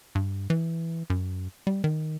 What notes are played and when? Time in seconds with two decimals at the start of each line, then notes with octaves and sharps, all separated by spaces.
0.15 G2
0.50 E3
1.10 F#2
1.67 G3
1.84 D#3